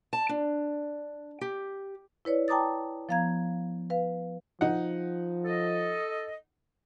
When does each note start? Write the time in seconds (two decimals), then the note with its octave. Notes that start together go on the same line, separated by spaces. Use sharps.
0.13 A5
0.29 D4
1.41 G4
2.25 E4 B4 C#5 D5
2.48 G5 A5 A#5 D6 D#6 A6
3.09 F3 B3 F5 A#5 G#6
3.90 B4 F5
4.61 F3 D#4 F#5
5.45 A4 D#5